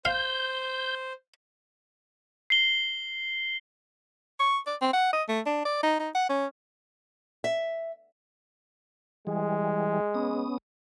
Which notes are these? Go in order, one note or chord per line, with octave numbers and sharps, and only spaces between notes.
C5 F5 G6
C7 G7
C#6
D5
C4
F#5
D#5
A3
D4
D5
D#4
D#4
F#5
C#4
E5
E3 G3 G#3 G#4
B3 C#4 D#6